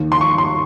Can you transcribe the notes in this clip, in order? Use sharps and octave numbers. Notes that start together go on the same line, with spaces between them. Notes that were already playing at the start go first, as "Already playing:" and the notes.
Already playing: D#2 D#3
C6
C#6
C6